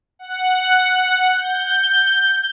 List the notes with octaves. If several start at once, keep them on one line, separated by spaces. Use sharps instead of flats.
F#5
G6